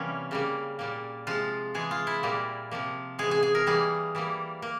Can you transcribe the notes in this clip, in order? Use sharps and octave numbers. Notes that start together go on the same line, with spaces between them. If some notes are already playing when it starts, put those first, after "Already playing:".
Already playing: C3 E3 G3 A#3 C#4
C#3 G3 A#3
A#2 G3 A#3
C3 F3 G#3 F4
E3 G#3 G#4
F4
E4
A#2 G3 A#3
C3 F3 A#3
C3 E3 G#3 G#4
G#4
G#4
A#4
E3 G3 A#3 G#4
E3 G3 A#3
A#3